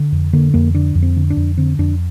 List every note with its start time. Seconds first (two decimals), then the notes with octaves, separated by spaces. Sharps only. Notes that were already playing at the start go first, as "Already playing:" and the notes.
Already playing: D3
0.12 F2
0.33 D3 A#3
0.54 F2 A#3
0.74 D3 D4
0.95 F2
1.03 C4
1.17 D3
1.30 D4
1.37 F2
1.58 D3 C4
1.79 F2 D4